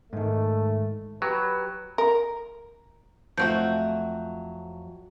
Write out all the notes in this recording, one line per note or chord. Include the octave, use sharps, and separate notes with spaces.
G#2 D#3 A3
F#3 G4 B4
A#4
F2 F3 F#3 A3 C4 F#4 G6